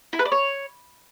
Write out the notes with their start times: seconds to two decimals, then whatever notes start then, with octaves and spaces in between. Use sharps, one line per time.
0.13 E4
0.19 B4
0.25 D5
0.32 C#5